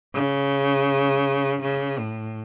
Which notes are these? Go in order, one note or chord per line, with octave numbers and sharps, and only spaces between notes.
C#3
C#3
A2